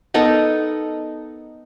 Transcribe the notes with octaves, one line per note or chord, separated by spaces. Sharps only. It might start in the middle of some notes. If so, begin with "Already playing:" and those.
B3 D#4 A4 A#4